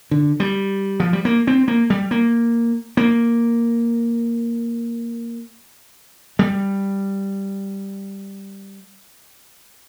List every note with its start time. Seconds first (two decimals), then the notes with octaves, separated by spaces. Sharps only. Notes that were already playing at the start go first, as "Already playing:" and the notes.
0.11 D3
0.40 G3
1.00 F3
1.13 G3
1.25 A#3
1.47 C4
1.68 A#3
1.90 G3
2.11 A#3
2.97 A#3
6.39 G3